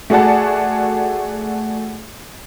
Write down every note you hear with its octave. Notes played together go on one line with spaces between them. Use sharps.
A3 F#4 G#4 D5 F#5 A5